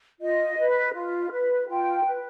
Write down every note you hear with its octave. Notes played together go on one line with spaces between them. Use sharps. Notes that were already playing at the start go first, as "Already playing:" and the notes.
F4 D#5
B4
F4
B4
F4 G5
B4